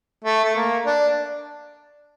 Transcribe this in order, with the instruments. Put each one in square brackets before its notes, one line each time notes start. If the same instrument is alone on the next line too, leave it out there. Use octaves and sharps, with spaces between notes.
[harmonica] A3
A3
A#3
D4